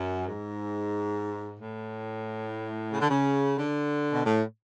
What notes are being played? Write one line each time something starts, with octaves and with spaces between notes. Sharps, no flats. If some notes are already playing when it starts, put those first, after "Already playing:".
Already playing: F#2
G#2
A2
C#3
D3
C#3
D3
B2
A2